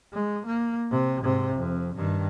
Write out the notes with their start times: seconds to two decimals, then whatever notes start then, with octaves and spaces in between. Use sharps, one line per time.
0.14 G#3
0.46 A#3
0.91 C3
1.22 G#2 C3
1.55 F2
1.96 G2 D#3